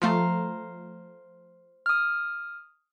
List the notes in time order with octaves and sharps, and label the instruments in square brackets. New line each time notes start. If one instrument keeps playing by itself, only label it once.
[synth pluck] F3 A3 [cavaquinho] C5 F5 A#5
[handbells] D#6 F6